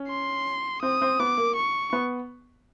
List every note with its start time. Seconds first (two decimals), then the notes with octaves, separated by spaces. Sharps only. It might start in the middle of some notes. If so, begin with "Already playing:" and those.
Already playing: C#4
0.09 C6
0.82 C4 D#6
1.02 C4
1.19 B3 D6
1.37 A#3
1.56 C#6
1.93 B3